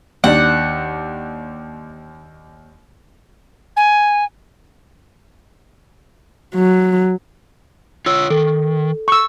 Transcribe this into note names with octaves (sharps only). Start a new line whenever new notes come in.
D#2 D4 F#5
G#5
F#3
F4 C#5 E6
D#3 A4
C#6 E6